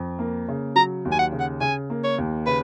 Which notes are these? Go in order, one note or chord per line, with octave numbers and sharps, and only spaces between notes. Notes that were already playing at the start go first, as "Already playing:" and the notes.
Already playing: F2
A#3
C#3
F#3 A#5
D#2
G#5
F#5
C#3
F#5
C#3 G#5
A#3
C#5
D#2
C#3 B4